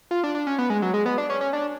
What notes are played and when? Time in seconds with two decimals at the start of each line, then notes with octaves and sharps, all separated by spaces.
0.11 F4
0.23 D4
0.35 D4
0.47 C#4
0.58 B3
0.70 G#3
0.82 F#3
0.94 G#3
1.06 B3
1.18 D4
1.30 C#4
1.41 C#4
1.53 D4